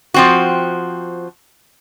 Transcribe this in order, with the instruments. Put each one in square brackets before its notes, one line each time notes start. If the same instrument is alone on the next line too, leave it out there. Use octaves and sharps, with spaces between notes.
[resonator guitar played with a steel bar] F3 C4 F#4